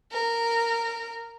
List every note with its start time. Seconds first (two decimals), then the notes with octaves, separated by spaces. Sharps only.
0.12 A#4